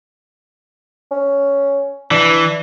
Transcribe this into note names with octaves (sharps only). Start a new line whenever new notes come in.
C#4
E3 D4